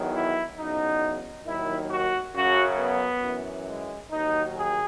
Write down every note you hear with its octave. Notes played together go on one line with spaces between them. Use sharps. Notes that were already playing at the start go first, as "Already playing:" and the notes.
Already playing: E2 D#3 F#3
E4
E2 C#3 F#3 D#4
D#2 D#3 F#3 E4
F#4
F#2 C#3 F#3 F#4
B3
F#2 E3
G#3
D#2 D#3 F#3 D#4
G#4